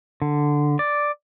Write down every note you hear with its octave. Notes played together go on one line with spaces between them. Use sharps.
D3
D5